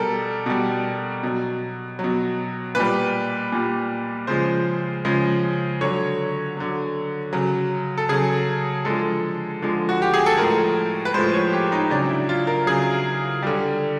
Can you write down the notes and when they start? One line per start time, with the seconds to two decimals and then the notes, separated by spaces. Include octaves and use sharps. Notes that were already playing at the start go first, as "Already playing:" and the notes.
Already playing: B2 G3 A4 A#4
0.46 B2 G3
1.23 B2 F#3
1.99 B2 F#3
2.75 A#2 G3 B4
3.52 A#2 G3
4.27 C#3 F3 G#3 C5
5.05 C#3 F3 G#3
5.81 D3 F#3 C#5
6.57 D3 F#3
7.33 C#3 F#3
7.98 A4
8.09 C#3 F#3 G#4
8.85 D3 F3 G#3 A4
9.62 D3 F3 G#3
9.89 F#4
10.02 G4
10.14 G#4
10.26 A4
10.38 A2 F3 G#3 A#4
11.05 B4
11.14 A2 F3 G#3 C5
11.34 C#5
11.53 G4
11.72 D#4
11.90 C#3 F#3 D4
12.09 E4
12.29 F4
12.47 A#4
12.66 C#3 F#3 G#4
13.42 D3 G3